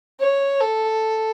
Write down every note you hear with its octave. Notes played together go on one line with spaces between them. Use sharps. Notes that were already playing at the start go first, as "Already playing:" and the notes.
C#5
A4